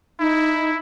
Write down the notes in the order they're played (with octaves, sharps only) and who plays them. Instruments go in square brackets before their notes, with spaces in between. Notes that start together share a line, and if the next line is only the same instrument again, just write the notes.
[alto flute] D#4 [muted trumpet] E4